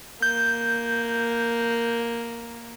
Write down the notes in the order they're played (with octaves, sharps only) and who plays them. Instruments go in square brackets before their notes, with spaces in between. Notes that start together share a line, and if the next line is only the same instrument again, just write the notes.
[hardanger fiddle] A#3 [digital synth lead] G6